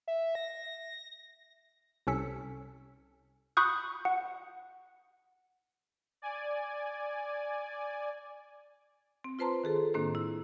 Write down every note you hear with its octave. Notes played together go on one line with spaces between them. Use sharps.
E5
A#6
C2 C3 C#4 A4 B6 C#7
B5 C#6 D#6 F#6 G6
F#5
D5 G#5
C4
F4 B4 C5 A5 A#5 C6
D#3 G#4 A4
A2 D#3 A#3 C4 D4
E4